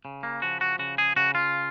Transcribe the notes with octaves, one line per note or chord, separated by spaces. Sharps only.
C#3
A#3
F3 F#4
F#4
C#3 F#4
G#4
C#3 F#4
F4